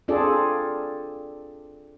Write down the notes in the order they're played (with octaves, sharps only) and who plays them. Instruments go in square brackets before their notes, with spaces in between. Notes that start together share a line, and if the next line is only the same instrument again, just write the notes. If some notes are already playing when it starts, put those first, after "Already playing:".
[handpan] C4 D4 F4 G#4 A4 D5